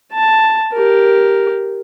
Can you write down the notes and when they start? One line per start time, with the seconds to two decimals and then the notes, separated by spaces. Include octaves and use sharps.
0.13 A5
0.73 G4 A#4